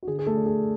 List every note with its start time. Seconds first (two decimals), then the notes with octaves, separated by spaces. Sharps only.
0.03 F#4
0.07 D3 G#4
0.19 G#4
0.26 A3 A4
0.36 D4
0.46 G#4